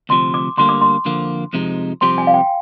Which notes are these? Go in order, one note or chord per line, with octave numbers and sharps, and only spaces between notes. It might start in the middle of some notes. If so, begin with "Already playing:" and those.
D2 C3 F3 C6
D6
D2 D3 G3 A#3 C6
D6
C6
F2 D3 F3 A#3
F2 C3 F3 G#3 D#4
C2 C3 F3 C4 G4 C6
G#5
F5
G5